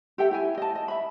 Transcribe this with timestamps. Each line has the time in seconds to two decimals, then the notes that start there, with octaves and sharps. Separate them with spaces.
0.18 G4 A4 E5 G5
0.31 E4 G5 G#5
0.58 D#5 A5
0.75 D#5
0.88 E5 B5